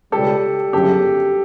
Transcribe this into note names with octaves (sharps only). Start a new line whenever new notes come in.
C#2 B2 G3 G4 A4
G1 F#2 C#3 G4 A4